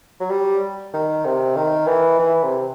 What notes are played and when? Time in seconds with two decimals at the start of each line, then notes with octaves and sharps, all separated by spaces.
0.20 F#3
0.30 G3
0.94 D#3
1.25 C3
1.56 D#3
1.87 E3
2.19 E3
2.43 C3